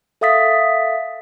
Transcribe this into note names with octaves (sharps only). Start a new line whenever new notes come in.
A4 E5 F5 D#6 A6 B6